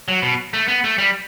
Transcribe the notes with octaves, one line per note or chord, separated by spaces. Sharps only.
F#3
B2
A3
B3
A3
G3